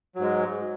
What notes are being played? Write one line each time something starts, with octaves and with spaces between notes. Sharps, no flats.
G#2 F#3 G#3